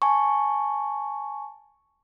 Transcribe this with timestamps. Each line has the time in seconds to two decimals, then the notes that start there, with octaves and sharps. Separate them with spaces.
0.02 G#5 A5 C#6